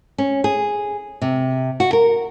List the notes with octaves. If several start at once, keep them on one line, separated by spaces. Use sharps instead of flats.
C#4
G#4
C3
F#4
A#4